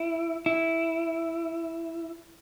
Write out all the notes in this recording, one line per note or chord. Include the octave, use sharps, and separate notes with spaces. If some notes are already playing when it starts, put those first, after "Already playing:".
Already playing: E4
E4